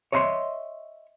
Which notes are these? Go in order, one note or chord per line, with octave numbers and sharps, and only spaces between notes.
C#5 D#5 E5 A#5 C6